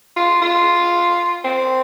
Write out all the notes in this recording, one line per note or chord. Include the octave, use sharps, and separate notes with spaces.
F4
F4
C4